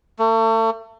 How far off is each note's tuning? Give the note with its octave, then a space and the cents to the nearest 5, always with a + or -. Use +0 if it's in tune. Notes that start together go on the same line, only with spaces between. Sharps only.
A3 +35